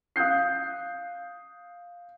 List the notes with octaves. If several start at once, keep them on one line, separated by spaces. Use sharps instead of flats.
F5 D#6 F#6 G6 C7